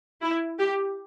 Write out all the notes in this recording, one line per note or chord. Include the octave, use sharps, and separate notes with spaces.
E4
G4